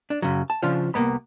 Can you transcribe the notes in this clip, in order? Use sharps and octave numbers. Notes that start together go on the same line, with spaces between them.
D4
F#2 C#3 F#3
A5
C#3 F3 C#4 D4 F4 C5
C2 F#2 A#3 B3 B5